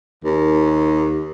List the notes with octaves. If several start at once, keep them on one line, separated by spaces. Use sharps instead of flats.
D#2